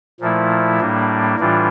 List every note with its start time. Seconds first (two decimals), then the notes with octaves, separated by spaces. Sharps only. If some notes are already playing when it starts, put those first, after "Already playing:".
0.21 A#2 F3 A3 E4
0.80 A2 G3 A#3 D4
1.39 A2 E3 G3 D4 F4